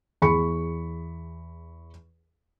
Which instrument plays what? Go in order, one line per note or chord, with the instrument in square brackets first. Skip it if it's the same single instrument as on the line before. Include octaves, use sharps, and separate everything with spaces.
[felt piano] E2 G#4 B5 C#6 C#7